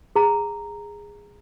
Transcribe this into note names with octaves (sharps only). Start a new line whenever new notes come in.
G#4 A#5